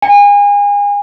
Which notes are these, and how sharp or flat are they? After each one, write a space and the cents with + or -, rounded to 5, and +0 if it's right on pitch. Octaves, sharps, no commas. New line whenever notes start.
G#5 -35